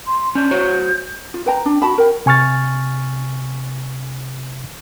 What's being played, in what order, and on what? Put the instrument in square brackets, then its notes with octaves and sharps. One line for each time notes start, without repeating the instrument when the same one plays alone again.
[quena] C6
[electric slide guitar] C#4 D4 [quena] G6
[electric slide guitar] F#4 C5 C#5
[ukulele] F4
B4 G5 A#5
D4
F#4 A5 B5
A#4 G5
[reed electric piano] C3 G#5 C#6 F6 A6